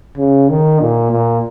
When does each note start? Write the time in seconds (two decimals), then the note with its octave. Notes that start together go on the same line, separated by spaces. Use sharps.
0.18 C#3
0.50 D#3
0.80 A#2
1.12 A#2